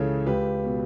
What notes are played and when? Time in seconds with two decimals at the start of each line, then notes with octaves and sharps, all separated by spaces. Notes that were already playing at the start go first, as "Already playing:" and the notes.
Already playing: C#2 C#3 E3 A4 C#5
0.26 C#2 G4 B4
0.64 B2